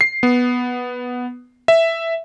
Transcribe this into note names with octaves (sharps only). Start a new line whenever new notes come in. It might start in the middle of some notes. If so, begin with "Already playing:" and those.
C7
B3
E5